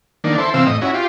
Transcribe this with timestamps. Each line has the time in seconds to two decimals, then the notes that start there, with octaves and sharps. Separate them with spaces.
0.24 D#3 A#3 D4
0.38 E4 A4 C5
0.54 C3 E3 C4 F5 E6
0.66 A2 D#5
0.82 C#4 E4 F#4
0.94 F4 G4